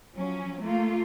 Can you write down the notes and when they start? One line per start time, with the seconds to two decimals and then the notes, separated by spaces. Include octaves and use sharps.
0.14 F3 F#3 C#4
0.60 A3 A#3 F4